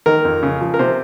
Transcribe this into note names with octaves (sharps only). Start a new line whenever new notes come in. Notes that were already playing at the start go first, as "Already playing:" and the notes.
D#3 A#4
F2
C#3
F3
A#4
C3 C5